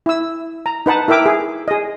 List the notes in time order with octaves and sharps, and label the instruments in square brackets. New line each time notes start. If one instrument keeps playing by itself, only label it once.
[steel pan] E4 E6
A#5
D#4 B4 F#5 A5
E4 A#4 E5 G5 D6
G#4
G#4 D#5